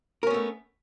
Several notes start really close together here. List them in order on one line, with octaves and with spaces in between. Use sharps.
A#4 C#4 B3 A3